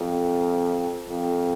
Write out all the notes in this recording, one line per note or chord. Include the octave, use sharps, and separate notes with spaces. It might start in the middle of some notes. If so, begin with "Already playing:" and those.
Already playing: F2
F2